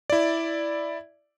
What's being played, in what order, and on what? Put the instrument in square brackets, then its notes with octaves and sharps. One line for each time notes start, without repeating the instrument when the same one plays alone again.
[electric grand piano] E4 D5